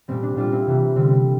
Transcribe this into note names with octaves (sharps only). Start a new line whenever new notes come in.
A#2 G3 C4
D4
A#2 G3 D4 F4
C4 E4
C3 E3 G3
D3 G3 C4
C4